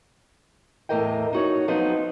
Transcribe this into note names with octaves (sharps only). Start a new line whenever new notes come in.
E2 A2 E3 A#4 D#5 G5
D#4 F#4 C#5
F3 F#3 B3 C4 D#4